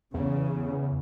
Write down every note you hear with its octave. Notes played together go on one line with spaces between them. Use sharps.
E2 C#3